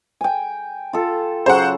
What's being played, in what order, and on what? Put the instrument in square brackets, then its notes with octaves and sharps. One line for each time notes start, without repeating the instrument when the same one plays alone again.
[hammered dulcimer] G5 G#5
F4 A4
[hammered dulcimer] C#3 F#3 [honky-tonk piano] C5 F#5